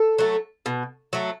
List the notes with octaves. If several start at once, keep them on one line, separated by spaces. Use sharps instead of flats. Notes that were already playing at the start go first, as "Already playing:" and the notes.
Already playing: A4
F#3 A3
B2
F#3 A3